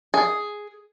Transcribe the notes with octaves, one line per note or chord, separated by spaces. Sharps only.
G#4